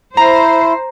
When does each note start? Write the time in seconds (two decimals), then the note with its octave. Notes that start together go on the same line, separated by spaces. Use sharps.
0.17 E4 C5 A#5